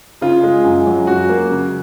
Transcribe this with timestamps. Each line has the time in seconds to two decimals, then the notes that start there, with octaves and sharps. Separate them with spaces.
0.21 C#3 F4
0.43 G#3
0.64 F#2
0.87 F#3
1.07 F#2 F#4
1.29 A#3
1.51 C#3